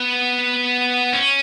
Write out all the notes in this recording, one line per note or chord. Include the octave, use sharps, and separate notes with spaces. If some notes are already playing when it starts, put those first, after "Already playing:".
Already playing: B3
C#4